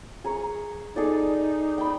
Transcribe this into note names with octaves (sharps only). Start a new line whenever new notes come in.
G#4 A#5 C#6
D#4 G#4 A4 D5
G5 B5